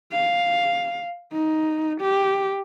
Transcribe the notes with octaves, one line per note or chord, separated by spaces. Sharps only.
F5
D#4
G4